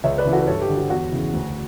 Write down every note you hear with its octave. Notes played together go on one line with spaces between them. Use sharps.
C#2 C#5 E5
B4 D5
C#3 E3
F#4 A4
B4
G2 A4 C#5
G4
D3
F#4
E2 F#4
C#3 E3
D2